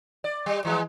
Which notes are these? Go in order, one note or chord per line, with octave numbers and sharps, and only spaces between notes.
D5
G3
E3 F3 G#3